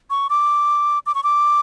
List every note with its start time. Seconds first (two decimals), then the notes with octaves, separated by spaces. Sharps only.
0.10 C#6
0.30 D6
1.06 D6
1.15 C#6
1.23 D6